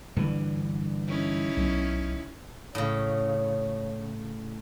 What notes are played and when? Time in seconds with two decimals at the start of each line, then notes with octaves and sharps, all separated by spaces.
0.16 G2 D3 E3
1.08 C#4 D#4 E4
1.57 B1
2.75 A2 C#3 C#5